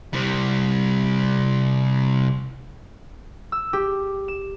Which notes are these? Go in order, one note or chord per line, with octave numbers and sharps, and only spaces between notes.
C3 G3
E6
G4
E7